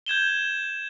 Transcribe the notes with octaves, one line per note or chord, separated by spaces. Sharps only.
G6 G#6 E7 G7